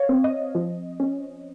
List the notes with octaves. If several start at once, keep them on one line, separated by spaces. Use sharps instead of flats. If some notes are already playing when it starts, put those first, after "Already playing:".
Already playing: C#5 F5
C4
D#5
F3
C#4